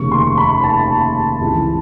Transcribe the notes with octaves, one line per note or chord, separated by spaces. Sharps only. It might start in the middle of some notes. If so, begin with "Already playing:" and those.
Already playing: F1 D#2 C#3 C#6
C6
B5
A5
C#2 C3 E3